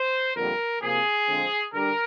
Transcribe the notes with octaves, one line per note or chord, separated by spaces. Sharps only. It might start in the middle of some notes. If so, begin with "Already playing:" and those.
Already playing: C5
F2 D3 G3 A#3 A#4
C3 F3 A#3 G#4
D3 F3 G#3 C4
D3 G3 A#4